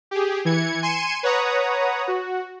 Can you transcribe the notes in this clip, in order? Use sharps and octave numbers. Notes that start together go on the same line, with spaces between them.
G4 G#4
E3 G#6 C#7
G#5 C6 C#7 D#7 E7
B4 C#5 F#5 A#5 D#6
F#4